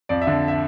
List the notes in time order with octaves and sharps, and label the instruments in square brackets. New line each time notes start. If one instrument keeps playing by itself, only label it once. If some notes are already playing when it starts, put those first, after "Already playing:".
[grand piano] F2 D5
E5
D3
E5